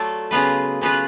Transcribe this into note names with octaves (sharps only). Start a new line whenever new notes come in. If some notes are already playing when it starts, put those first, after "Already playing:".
Already playing: F#3 A3 F4 A4 D5
C#3 F#3 B3 F4 B4
C#3 F#3 B3 F4 B4